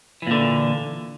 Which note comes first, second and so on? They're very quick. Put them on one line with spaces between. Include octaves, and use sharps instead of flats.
E3 A#2 D3